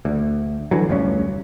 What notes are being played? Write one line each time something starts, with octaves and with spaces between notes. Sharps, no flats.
D2
D3 E3 F#3
F1 D2 G2 C#4